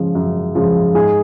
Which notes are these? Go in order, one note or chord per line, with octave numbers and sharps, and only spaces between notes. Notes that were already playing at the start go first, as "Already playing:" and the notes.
Already playing: C#3 F3 G#3
F#2
C#3 F3 G#3
G#2 G#4